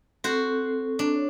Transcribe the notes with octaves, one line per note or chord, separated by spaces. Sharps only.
C4 F#4 A4 C5
D4
C#5